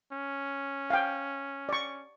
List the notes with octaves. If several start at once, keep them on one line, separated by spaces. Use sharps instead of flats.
C#4
F5 G5
D5 C#6